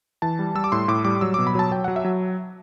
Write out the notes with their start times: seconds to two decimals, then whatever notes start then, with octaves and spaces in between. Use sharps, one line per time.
0.22 E3 A5
0.39 G3
0.55 G3 E6
0.64 D6
0.72 A2 C6
0.88 A2 D6
1.05 G3 D6
1.21 F#3 E6
1.34 B2 D6
1.47 B5
1.55 F#3 A5
1.71 F#3 G5
1.84 F#3 F#5
1.96 E5
2.04 F#3